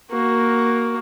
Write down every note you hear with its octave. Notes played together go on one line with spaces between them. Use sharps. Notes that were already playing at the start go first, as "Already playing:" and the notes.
A#3 F#4